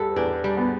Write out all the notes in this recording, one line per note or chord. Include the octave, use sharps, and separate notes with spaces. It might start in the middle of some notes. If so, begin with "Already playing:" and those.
Already playing: E2 G3 A4 B4
E2 D4
G3
B3